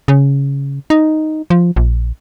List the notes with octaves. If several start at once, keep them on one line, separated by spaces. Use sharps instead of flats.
C#3
D#4
F3
A#1